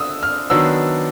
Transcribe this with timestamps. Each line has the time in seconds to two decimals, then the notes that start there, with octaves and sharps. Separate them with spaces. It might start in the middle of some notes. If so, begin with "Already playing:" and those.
Already playing: D3 D#6 E6
0.23 F6
0.50 D#3 F#3 B3 D4 E6